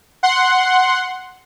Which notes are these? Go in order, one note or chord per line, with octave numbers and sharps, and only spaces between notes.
F#5 C6